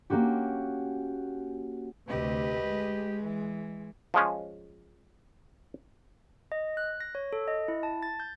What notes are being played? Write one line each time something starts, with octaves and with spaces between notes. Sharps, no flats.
A#3 C#4 F#4 G4
D2 C3 G4 B4 D#5
G#3
E3
F3 G#3 C#4
D#5
F#6
A#6
C#5
A4
D#5
E4
A5
A6
G6